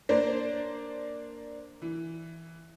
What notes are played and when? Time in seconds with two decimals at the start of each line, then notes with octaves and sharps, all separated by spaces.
0.09 A#3 D4 C5 D5
1.82 E3